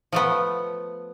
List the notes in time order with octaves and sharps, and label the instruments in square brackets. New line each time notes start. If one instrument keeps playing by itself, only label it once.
[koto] F3 A3 B3